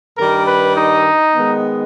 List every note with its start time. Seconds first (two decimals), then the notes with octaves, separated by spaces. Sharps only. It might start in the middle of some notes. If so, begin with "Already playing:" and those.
0.18 G2 D#3 G3 A#4
0.47 B4
0.77 D#4
1.36 D#3 G#3 B3